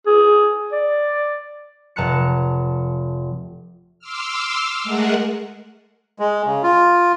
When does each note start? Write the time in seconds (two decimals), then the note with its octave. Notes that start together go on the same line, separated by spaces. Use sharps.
0.07 G#4
0.72 D5
1.96 F1 A5 A#5 F#6 C#7
3.99 C6 D6 E6 F6
4.84 G#3 A3 G#4 A#4 F#5
6.19 G#3
6.46 C#3
6.63 F4